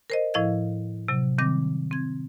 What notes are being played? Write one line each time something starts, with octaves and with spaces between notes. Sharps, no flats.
A#4 C5 D#5
A2 F3 E4 D#5 F5 G#6
C3 F#3
D#3 G3 C4 D6 A#6
C4 G#6